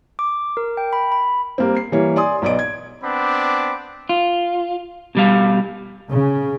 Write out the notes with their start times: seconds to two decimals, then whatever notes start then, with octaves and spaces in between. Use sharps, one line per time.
0.19 D6
0.57 A#4
0.77 G5
0.93 B5
1.12 B5
1.58 G3 A#3 C4
1.77 C7
1.92 E3 G3 A#3 C#5
2.16 D5 G#5 C6 D#6
2.42 B1 B3 D5 D#5 D7
2.59 G#6
3.03 B3 C4 D4 B5 D6
4.09 F4
5.15 B2 G3 F5
6.11 C#3